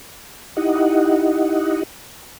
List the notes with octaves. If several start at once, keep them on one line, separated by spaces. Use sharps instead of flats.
D#4 E4 G4 D#5 F#5